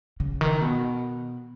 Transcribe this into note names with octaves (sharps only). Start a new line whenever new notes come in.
C#3
D#3
B2